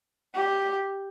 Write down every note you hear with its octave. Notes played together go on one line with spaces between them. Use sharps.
G4